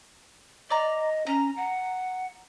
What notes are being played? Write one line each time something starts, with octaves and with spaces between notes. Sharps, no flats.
D5 D#5 A#5
C#4 A#5
F#5